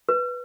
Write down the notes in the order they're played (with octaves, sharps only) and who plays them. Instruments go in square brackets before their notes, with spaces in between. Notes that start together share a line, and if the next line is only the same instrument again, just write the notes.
[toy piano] B4